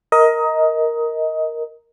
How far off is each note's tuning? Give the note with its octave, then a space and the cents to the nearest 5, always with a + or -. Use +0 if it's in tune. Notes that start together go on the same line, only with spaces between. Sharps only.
A#4 +0 D#5 +20